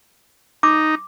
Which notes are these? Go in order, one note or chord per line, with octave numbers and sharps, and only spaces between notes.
D#4 D6